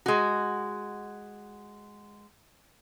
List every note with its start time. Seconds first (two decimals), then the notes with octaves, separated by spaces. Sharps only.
0.06 G#3 F#4